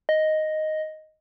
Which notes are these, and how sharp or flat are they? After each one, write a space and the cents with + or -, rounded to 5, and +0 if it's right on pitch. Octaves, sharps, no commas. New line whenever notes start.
D#5 +0